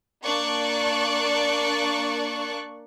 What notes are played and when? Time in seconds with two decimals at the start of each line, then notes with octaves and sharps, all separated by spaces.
0.24 A#3 D4 D5 C#6 F#6